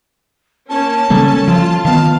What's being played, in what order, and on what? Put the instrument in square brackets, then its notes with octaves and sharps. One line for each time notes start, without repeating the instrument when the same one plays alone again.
[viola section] A#3 C#4 [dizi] A5
[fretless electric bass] C#3 G3 A#3 [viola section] C#4 A4
[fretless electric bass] F3 [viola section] F4
[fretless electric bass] D#3 B3 [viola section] F5 [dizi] A5